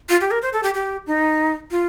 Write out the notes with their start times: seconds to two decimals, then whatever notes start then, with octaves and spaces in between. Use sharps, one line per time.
0.09 F4
0.21 G4
0.31 A#4
0.42 C5
0.53 A4
0.63 G4
0.74 G4
1.07 D#4
1.71 F4